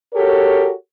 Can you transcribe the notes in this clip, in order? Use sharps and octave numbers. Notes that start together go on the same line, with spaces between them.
F#4 G4 A4 A#4 C#5